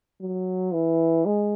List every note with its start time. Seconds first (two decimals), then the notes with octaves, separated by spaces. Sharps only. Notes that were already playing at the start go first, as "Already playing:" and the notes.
0.21 F#3
0.73 E3
1.26 G#3